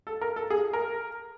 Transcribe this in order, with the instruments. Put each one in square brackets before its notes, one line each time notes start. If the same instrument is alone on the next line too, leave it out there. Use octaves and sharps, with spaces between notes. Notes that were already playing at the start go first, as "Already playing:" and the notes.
[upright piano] A4
A#4
A4
G#4
A#4